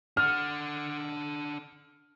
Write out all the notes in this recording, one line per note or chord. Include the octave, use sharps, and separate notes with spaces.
D4 F#5 F6